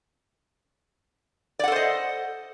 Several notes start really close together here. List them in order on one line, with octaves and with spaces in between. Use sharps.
D5 F#5 A4 C5 D#5